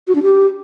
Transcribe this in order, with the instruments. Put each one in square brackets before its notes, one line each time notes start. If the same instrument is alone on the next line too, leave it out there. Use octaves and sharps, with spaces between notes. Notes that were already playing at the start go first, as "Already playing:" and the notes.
[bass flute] F#4
D4
G4